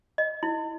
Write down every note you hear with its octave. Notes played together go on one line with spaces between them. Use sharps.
D#5
E4